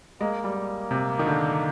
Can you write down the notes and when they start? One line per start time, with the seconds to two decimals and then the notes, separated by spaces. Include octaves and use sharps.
0.21 G#3 A#3
0.44 G3
0.57 A#3
0.91 C3
1.19 D#3
1.27 D3